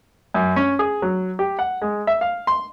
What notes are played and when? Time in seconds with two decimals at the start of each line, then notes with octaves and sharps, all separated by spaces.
0.34 F#2
0.56 C#4
0.79 G#4
1.02 F#3
1.39 G4
1.59 F#5
1.82 G#3
2.07 E5
2.21 F5
2.47 C6